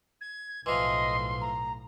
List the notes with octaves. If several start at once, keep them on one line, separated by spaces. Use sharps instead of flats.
G#6
B1 A2 E3 F3 D#5 C6
A#5